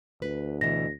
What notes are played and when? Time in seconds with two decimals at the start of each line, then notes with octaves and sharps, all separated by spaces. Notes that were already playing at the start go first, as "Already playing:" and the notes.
0.22 D2 B4
0.61 B2 E3 A#6